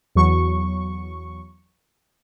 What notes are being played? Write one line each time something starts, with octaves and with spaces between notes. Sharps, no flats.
E2 F#3 C#6